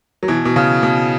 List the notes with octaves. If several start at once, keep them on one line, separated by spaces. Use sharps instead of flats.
F#3
B2 E3
B2
C#3
B2